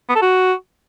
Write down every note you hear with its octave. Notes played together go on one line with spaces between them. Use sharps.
B3
A4
F#4